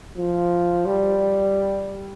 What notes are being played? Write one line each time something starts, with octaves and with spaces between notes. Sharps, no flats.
F3
G3